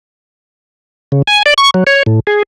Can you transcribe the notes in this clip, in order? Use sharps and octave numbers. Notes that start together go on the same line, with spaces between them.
C#3
G#5
D5
C#6
F#3
C#5
A2
G#4